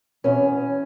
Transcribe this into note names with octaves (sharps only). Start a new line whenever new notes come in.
E2 B2 C#4